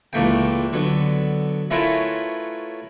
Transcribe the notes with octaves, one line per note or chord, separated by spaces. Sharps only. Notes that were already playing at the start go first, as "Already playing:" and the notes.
C#2 A#2 E3 A3 A#3 G5
D3 F#3 B3
A3 C#4 E4 F4 A#4 B4